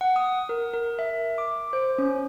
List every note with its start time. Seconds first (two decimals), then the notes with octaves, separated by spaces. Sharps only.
0.01 F#5
0.16 D#6
0.49 A#4
0.74 A#4
0.99 E5
1.38 D6
1.73 C5
1.98 C#4